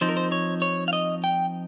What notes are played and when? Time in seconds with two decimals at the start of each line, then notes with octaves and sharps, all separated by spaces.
0.01 F3 C4 D#4 C5
0.09 A#4
0.17 C5
0.32 C#5
0.62 C#5
0.88 F5
0.93 D#5
1.24 G5